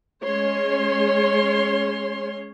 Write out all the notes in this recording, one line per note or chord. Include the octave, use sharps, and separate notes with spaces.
G#3 C#4 C#5 C6